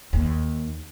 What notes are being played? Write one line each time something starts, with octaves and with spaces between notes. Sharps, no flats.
D#2